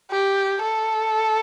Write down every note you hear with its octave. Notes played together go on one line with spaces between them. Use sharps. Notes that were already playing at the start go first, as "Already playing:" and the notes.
G4
A4